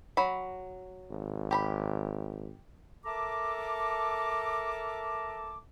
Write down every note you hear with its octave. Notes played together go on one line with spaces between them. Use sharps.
F#3 B5
G#1
G4 A#5 B5
A4 A#4 E5 A5 A#5 D6